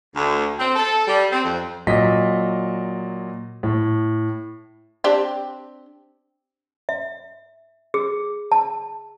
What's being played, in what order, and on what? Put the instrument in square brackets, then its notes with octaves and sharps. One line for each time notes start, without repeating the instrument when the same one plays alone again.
[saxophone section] D2
C4
A4
G3
C4
F2
[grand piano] A#2 F#3 D#5 B6
A2
[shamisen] C4 D4 G4
[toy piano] E5
G#4
A5